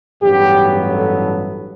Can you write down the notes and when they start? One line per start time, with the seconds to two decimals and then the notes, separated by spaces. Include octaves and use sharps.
0.21 A1 G2 F#3 B3 G4
0.89 A4